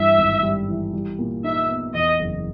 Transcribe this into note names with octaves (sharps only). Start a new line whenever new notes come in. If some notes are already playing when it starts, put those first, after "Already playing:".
Already playing: G2 E3 E5
G#1
G3
E3
G3
A#2
D#4 E5
B3
E2 D#5
F#1